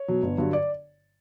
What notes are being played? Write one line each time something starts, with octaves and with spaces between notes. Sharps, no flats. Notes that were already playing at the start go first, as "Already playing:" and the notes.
Already playing: C#5
B2 F#3
G1
G2 D3 F#3
D5